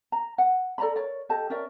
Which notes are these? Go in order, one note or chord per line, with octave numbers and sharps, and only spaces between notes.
A#5
F#5
A4 D5 A#5 B5
A#4 C#5 D5
G4 A4 D#5 A5
C#4 A#4 D5 E5